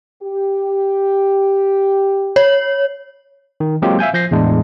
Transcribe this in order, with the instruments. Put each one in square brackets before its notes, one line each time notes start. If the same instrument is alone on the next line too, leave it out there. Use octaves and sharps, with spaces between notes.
[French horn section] G4
[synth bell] C#5
[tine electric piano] D#3
F#3 G#3 A#3 C4 F4 G4
E5 F5 G#5 G6
F3 G6 A#6 C7
E2 A2 G#3 D4